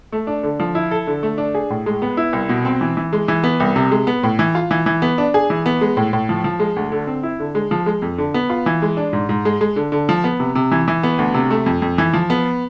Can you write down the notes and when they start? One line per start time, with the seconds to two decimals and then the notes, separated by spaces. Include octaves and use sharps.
0.12 A3
0.27 D4
0.43 D3
0.60 F3
0.75 E4
0.91 A4
1.07 D3
1.23 A3
1.38 D4
1.55 G#4
1.70 A2
1.86 G#3
2.02 B3
2.17 E4
2.33 C2
2.49 B2
2.65 C4
2.81 E3
2.97 E3
3.13 G#3
3.28 E3
3.44 B3
3.60 C2
3.76 C3
3.91 G#3
4.07 B3
4.23 A2
4.39 E3
4.55 F4
4.71 E3
4.86 E3
5.02 B3
5.18 D4
5.34 G#4
5.50 E3
5.66 B3
5.81 G#3
5.97 A2
6.13 A2
6.29 F3
6.44 F3
6.60 G#3
6.76 D2
6.92 D3
7.07 C4
7.23 E4
7.40 D3
7.55 G#3
7.71 F3
7.86 G#3
8.02 F2
8.18 D3
8.34 B3
8.50 F4
8.66 E3
8.82 G#3
8.97 D4
9.13 G#2
9.29 G#2
9.45 G#3
9.61 G#3
9.76 D3
9.92 D3
10.09 F3
10.24 B3
10.40 C3
10.55 C3
10.71 E3
10.88 E3
11.03 B3
11.19 D2
11.34 C3
11.51 A3
11.66 F2
11.82 F2
11.98 E3
12.13 F3
12.30 B3